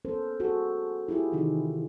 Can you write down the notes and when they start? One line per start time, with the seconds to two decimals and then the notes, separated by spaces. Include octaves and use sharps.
0.05 B3 C#4 A4 A#4 C5
0.40 F#4 G#4 A4
1.09 E4 F4 G4 G#4
1.32 C3 D#3 E3 D#4